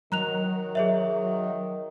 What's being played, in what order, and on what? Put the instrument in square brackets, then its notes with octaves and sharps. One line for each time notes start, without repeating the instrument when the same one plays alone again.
[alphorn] D#3 [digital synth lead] F#3 [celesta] A#5 F#6 F7
[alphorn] D#3
[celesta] G#4 C#5 E5